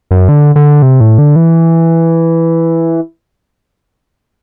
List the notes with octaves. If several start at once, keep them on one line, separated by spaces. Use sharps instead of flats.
F#2
D3
D3
C3
A2
D3
E3